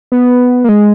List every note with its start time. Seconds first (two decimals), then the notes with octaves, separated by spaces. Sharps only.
0.12 B3
0.64 A#3
0.69 G#3